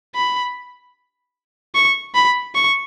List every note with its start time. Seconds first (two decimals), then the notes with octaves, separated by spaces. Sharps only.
0.15 B5
1.75 C#6
2.15 B5
2.55 C#6